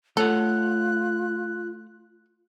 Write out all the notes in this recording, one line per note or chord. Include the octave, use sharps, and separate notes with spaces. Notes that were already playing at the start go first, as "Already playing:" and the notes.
A3 F4 A4 C#5 F#5 F#6